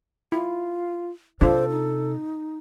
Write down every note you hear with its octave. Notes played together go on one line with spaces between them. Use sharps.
E4 F4
C3 D4 F4 A4 C5
D#4